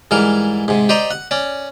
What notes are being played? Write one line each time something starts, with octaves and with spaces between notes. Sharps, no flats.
G#2 E3 G3 A#4
G#2 C3
G4 C5 D5 D#5 A#5
F#5
C#4 D5